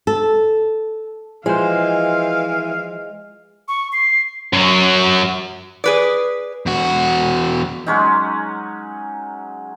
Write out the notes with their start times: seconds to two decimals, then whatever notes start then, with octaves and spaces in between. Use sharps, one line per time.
0.07 A4
1.46 E3 F3 G#3 C5 F5
3.68 C#6
3.93 C7
4.53 F#2 F#3
5.84 G#4 B4 D5
6.66 E2 F#4
7.86 F#3 G#3 C#4 D#4